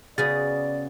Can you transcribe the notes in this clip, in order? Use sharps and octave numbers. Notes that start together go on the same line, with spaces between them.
C#3 B3 F#4 G#4 D5 A6